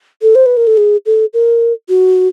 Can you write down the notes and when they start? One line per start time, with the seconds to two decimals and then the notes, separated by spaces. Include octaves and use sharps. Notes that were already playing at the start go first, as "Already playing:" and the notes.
0.22 A4
0.35 C5
0.46 B4
0.57 A#4
0.67 A4
0.77 G#4
1.06 A4
1.34 A#4
1.89 F#4